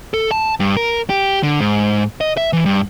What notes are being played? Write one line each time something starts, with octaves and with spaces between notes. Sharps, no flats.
A4
A5
G2
A#4
G4
D3
G#2
D#5
E5
E3
G2